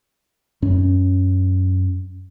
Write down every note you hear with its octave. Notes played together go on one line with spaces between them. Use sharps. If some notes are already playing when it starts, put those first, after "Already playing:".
F#2 C#4